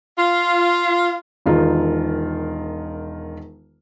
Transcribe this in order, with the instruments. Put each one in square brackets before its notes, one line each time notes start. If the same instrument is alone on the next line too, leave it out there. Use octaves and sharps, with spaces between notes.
[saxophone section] F4
[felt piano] E1 D#3 F4